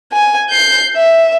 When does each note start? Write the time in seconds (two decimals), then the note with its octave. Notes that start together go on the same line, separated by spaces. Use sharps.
0.12 G#5
0.50 G6 C7
0.96 E5